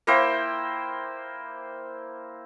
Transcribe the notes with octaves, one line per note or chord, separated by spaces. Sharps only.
A#3 E4 C5 G5